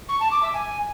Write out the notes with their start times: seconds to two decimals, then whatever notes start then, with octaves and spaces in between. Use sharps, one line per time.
0.09 C#6
0.20 A5
0.31 D6
0.42 E5
0.54 G#5